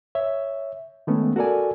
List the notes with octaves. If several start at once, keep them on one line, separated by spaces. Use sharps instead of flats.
C#5 E5
D#3 G#3 A3 B3 C#4
F#4 A4 A#4 D5 G#5